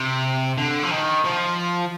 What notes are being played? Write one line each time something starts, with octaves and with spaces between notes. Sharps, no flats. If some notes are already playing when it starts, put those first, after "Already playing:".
Already playing: C3
D3
F3
D#3
F3